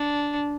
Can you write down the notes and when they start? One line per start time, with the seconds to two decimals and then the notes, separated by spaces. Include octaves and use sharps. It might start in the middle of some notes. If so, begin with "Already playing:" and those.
Already playing: D4